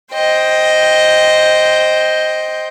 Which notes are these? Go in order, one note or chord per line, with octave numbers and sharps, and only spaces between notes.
C5 D#5 G5